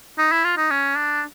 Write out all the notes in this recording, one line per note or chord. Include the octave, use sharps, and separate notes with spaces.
D#4
E4
F4
D#4
C#4
D4